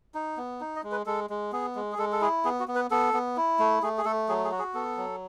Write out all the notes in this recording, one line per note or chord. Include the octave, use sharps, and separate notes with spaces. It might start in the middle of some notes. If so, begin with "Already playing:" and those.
D#4
B3
D#4
D#5
G#3
B4
G#3 A4
G#3
B3 G#4
G#3
G#4
G#3 A4
A4
E4 G#4
B3 G#4
F#4
B3
B4
B3 A4
B3
E4
A3
A3 G#4
G#4
A3 A4
F#3 G#4
G#4
F#4
G#4
B3 A4
F#3